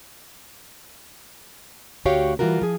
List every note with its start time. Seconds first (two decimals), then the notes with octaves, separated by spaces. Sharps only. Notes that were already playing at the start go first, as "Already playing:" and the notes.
2.05 D2 F#4 G4 C#5 F5 G5
2.39 E3 F3 G3 F4 F#4 A#4
2.62 F3 G#4